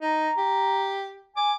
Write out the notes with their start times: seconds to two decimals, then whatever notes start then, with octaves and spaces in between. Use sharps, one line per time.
0.02 D#4 A#5
0.37 G4
1.37 G#5 D6